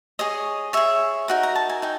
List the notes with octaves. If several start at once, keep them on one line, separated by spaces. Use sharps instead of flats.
G#4 C#5 D#5
G#4 C#5 E5
D#4 F#4 A#4
A#5
A5
G#5
D#4 G5